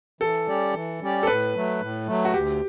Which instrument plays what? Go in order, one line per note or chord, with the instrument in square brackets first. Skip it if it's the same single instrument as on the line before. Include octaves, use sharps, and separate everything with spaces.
[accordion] E3 [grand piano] A4
[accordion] G3 C#4 G4 D5
E3
G3 C#4 G4 D5
[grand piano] A4
[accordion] A2 [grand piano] B4
[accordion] F#3 A3
A2
F#3 A3
[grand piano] F#4
[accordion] D2 [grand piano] G4